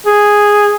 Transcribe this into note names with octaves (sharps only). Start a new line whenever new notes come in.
G#4